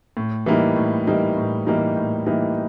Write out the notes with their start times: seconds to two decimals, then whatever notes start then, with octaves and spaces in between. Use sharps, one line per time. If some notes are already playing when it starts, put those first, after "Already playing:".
0.17 A2
0.46 E3 G3 A#3 D#4
0.76 A2
1.07 E3 G3 A#3 D#4
1.37 A2
1.67 E3 G3 A#3 D#4
1.96 A2
2.26 E3 G3 A#3 D#4